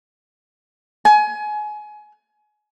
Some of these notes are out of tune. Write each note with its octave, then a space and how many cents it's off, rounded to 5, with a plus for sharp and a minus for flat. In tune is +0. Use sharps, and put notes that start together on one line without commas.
G#5 +25